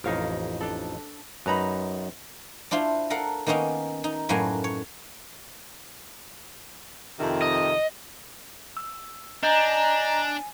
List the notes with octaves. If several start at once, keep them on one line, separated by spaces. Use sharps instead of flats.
A1 F2 D#4 A#4 C#5 F5
D4 A4
F#2 D#4 B4 A#5 B5
D4 E4 F4 C5
A4 A#4 F5 F#5
D#3 A#3 B3 C#4 D#4
D#4
F#2 A2 F#3 A#3 B4 G#5
C#5
F2 C3 D#3
D#5
E6
D4 D#5 G#5 A#5 G6